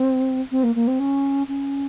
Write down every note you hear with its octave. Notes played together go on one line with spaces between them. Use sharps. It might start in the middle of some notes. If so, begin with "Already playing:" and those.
Already playing: C4
C4
A#3
A#3
C4
C#4
C#4